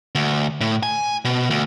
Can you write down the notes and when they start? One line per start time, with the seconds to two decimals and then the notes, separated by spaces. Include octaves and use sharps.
0.15 D2
0.61 A2
0.83 G#5
1.25 B2
1.50 D2